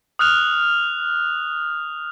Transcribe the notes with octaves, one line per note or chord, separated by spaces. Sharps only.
D#6 F6 F#6 F7